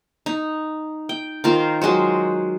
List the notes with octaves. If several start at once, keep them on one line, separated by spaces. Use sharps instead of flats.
D#4
G5
D#3 F4 A#4 C5
F#3 G#3 F#4 C5